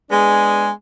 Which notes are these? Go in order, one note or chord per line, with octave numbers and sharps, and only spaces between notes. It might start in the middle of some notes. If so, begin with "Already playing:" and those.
G#3 B3 D4 G#4